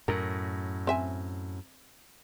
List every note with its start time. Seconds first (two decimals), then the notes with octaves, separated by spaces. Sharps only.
0.08 F#2 A2 A#4
0.87 C4 E5 G#5